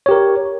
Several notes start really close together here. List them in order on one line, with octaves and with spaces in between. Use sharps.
C#5 G4 A#4